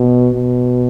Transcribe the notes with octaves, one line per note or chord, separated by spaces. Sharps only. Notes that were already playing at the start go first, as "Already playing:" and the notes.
Already playing: B2
B2